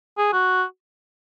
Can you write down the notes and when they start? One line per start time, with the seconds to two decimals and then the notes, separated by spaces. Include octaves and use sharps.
0.18 G#4
0.33 F#4